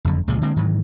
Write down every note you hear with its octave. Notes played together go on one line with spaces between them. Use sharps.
F#1 F2 D3
C#2 A#2 F3 G#3
D3 G#3 A#3 C4
G#2 D#3 E3 F#3